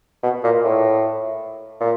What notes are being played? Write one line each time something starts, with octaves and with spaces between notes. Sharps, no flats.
B2
A#2
A2
A#2